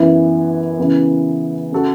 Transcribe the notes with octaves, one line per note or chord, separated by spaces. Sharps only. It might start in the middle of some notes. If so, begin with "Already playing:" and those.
Already playing: F#2 E3 B3 E4
C#3 E3 B3
C#3 A3 F#4 A4